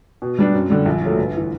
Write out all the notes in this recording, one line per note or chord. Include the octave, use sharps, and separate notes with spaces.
B2
G3 B3 D4
F#2
D3 G3
A#1
A#2 F#3 A3
G1
E3